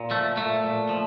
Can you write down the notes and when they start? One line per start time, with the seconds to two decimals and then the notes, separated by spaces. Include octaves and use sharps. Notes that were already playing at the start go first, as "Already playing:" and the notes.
Already playing: A#2
0.11 F3 A3
0.36 A#2 A3
0.64 A#2
0.89 F3